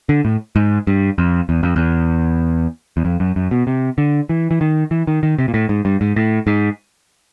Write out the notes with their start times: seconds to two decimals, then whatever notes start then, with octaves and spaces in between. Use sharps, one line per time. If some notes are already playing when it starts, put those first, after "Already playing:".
0.09 D3
0.25 A2
0.56 G#2
0.87 G2
1.18 F2
1.49 E2
1.63 F2
1.76 E2
2.97 E2
3.05 F2
3.20 F#2
3.36 F#2
3.51 B2
3.67 C3
3.98 D3
4.29 E3
4.51 E3
4.61 D#3
4.91 E3
5.07 D#3
5.23 D#3
5.39 C3
5.48 A#2
5.54 A2
5.69 G#2
5.85 G2
6.01 G#2
6.16 A2
6.47 G#2